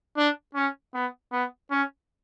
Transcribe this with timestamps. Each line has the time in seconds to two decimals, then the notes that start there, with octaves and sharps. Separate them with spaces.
0.17 D4
0.55 C#4
0.94 B3
1.32 B3
1.71 C#4